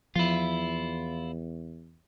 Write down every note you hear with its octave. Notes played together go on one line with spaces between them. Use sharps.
E2 F3 E4 F4